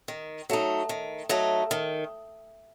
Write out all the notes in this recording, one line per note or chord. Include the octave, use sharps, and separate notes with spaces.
D#3
F#3 A3 D#4
D#3
F#3 A3 D#4
D#3